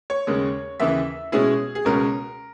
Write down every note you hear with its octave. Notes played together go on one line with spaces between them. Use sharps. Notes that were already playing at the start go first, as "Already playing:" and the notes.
C#5
D#2 C#3 G#3
D#2 C#3 E3 E5
B2 G#3 C#4 E4 G#4
G#4
C#2 B2 G#3 C#4 A#4